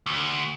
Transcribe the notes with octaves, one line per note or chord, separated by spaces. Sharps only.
D2